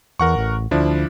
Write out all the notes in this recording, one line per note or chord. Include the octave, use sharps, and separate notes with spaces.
E2 A#4 F#5 C#6
A1
D2 F3 D4 E4